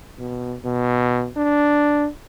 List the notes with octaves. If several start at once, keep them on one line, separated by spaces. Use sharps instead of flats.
B2
B2
D4